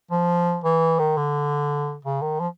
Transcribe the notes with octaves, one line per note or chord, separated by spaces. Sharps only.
F3
E3
D#3
D3
C#3
D#3
F3